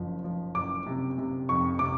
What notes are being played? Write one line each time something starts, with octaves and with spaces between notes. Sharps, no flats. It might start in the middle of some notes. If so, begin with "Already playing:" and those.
Already playing: F#1 F3
F3
F#1 D6
C3
C3
F2 C#6
C3 D6